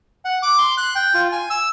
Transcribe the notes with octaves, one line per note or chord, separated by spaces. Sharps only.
F#5
D6
C6
F#6
G5
F4
G#5
E6